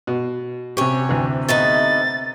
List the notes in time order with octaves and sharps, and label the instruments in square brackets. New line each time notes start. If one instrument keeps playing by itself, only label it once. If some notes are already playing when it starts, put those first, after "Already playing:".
[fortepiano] B2
[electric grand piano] C3 G4 [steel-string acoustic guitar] C#4 C#5
[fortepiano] D2 E3
[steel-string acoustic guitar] A3 B3 D#4 [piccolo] A6